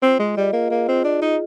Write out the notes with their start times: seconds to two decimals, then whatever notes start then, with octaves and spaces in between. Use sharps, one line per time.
0.02 C4 F4
0.19 G#3 G#4
0.36 G3 D#5
0.53 A#3 F4
0.70 A#3 G#4
0.88 C4 F4
1.04 D4 F4
1.22 D#4 G#4